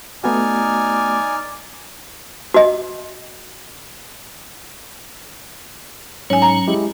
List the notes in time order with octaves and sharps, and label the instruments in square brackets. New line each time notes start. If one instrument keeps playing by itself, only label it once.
[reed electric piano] A3 B3 F#4 [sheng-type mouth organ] D#4 F6 [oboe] D5 [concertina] G#5
[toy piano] F#4 D#5
[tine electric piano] G#2 [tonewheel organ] F#3 C#4 [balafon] C#5 G#5
[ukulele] A#5
[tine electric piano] G#3 E4 G4